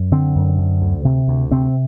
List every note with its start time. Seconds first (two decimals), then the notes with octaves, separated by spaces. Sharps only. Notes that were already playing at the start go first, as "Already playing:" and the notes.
Already playing: F#2
0.12 D3 C4
0.36 F#2
0.58 D3
0.82 D2
1.05 C3
1.28 D2
1.51 C3 C4